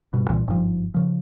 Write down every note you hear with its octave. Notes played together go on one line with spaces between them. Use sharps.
G2 B2
C2 A#2 E3
G1 G#2 C3 F3
C#3 F3